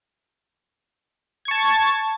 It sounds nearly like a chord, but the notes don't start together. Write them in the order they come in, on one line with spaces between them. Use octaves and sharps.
G#6 C#6 A5